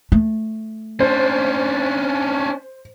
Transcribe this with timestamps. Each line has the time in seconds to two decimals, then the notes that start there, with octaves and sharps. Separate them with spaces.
0.12 A3
1.00 C#4 D4 C5